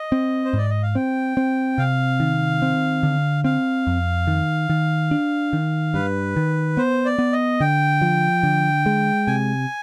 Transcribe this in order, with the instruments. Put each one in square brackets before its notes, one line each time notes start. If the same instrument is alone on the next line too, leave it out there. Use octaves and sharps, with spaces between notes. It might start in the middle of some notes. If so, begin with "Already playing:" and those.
Already playing: [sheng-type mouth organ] D#5
[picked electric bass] C4
[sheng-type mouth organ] C5
[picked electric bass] G#2 [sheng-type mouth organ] D5
[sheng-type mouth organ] D#5
F5
[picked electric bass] C4 [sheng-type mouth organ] G5
[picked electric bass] C4
[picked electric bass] C3 [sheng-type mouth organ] F5
[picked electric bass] D#3
C4
D3
[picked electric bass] C4 [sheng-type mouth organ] F5
[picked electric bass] F2
D#3
D#3
D4
D#3
[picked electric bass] G2 [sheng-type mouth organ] B4
[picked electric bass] D#3
[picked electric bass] B3 [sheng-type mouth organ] C5
[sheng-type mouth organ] D5
[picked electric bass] B3
[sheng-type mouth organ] D#5
[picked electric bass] D3 [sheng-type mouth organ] G5
[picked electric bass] F3
D3
G#3
[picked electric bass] C3 [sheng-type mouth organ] G#5